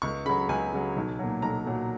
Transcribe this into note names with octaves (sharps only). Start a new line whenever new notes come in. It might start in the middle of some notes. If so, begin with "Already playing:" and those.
C#2 C#6
C#3 F#3 B5
C#2 G#5
C#3 F#3
B1
A#2 F#3
B1 A#5
A#2 F#3